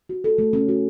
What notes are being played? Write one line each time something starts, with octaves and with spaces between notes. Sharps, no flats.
F#4
A4
A3
C#4
F#4